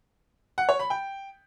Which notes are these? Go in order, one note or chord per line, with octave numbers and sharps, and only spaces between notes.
F#5
C#5
B5
G5